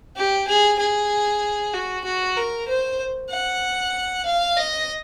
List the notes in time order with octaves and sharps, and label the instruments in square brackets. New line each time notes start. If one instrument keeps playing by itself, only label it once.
[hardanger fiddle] G4
G#4
G#4
F#4
F#4
A#4
C5
F#5
F5
D#5